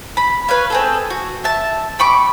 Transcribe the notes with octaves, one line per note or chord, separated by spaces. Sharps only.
B5
B4 C#5 F5
C4 G#4 A4
F#4
E5 A5
G5 B5 C#6 D6